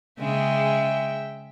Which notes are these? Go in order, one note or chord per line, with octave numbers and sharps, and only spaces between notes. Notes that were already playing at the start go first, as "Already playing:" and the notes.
C#3 G#3 E5 G5